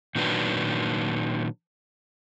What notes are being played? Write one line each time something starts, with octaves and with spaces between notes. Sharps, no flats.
A#2 D#3 F#3 D4 B4